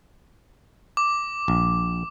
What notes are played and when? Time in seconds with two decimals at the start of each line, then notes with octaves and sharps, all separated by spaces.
0.97 D6
1.48 A#1